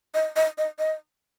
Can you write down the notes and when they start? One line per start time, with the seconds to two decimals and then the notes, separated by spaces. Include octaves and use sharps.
0.14 D#5
0.36 D#5
0.58 D#5
0.79 D#5